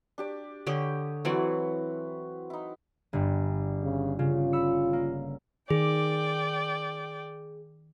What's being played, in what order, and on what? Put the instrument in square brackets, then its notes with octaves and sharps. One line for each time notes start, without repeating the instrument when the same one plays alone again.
[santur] D4 G4 D5
[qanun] D3 G4 [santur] C#5 D#6
[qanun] E3 F#3 D5 [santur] C4 E4 F#4
[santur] D#4 E4
[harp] G1 G2
[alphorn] C#3
[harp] C#3 [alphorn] F4
[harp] B5 E6 C#7
A#3
[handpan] D#3 [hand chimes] G#4 [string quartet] D5 G5